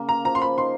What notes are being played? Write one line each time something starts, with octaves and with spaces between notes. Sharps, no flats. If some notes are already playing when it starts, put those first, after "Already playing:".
Already playing: C#3 A#3
A#5
F3 A#5
C6
B5
D#4 C6